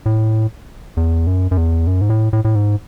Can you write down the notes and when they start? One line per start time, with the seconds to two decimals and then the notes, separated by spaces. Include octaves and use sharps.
0.06 A2
0.97 E2
1.27 F#2
1.51 F#2
1.57 E2
1.87 F#2
2.01 G#2
2.10 A2
2.33 A2
2.45 A2
2.55 G#2